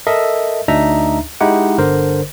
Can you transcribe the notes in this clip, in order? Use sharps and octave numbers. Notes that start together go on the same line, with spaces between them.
A4 A#4 D#5 E5
D2 D4 D#4 E5 A#5
G#3 D#4 E4 G4 F#5
G1 D3 A#4 C5